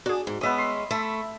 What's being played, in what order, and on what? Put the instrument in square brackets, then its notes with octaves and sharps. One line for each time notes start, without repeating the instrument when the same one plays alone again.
[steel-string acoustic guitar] D4 [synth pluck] F#4 G#4
[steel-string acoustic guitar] G#2
[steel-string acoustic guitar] G#3 C#4 [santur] B3 E5 D#6
[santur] C6
[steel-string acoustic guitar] A3 [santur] E5 A5 B5